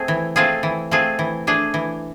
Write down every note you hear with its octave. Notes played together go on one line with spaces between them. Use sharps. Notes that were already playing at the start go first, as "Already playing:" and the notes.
Already playing: A3 C4 G#4
E3
A3 C4 F4 G#4
E3
A3 C4 F4 G#4
E3
A3 D4 G#4
E3